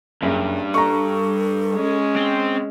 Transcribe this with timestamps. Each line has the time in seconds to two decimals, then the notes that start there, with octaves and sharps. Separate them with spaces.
0.23 F#1 G2
0.74 A4 A#5 C#6
1.73 G#3 C#4
2.16 C4